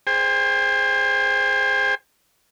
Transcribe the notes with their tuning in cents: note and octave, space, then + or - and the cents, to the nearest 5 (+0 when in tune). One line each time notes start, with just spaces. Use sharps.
G#4 +0 C5 +0 G5 +40